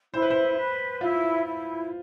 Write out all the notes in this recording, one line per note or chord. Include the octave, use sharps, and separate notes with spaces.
E4 C5
B4
C5
B4
E4 F4
E4